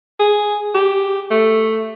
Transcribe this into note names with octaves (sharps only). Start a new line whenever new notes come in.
G#4
G4
A3